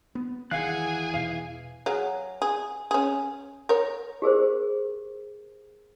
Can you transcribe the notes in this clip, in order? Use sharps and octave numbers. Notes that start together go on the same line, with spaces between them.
B3
E1 D#3 E3 G#4 F5 F#5 G#5 F#6
E2 B2 F5
F#3 G#4 F5
G#4
C#4 G#4
A#4 C#5
G4 G#4 A#4 C5